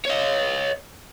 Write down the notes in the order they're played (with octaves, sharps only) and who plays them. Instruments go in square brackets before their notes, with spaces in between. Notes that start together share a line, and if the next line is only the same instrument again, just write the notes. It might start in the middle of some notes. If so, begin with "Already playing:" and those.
[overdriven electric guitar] C#5 D#5